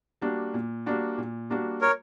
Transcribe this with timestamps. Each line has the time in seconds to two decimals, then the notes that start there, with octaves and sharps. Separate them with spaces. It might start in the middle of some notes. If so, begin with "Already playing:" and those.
0.22 G3 A#3 D4 F#4
0.54 A#2
0.86 G3 A#3 D4 F#4
1.18 A#2
1.50 G3 A#3 D4 F#4
1.82 A#4 C#5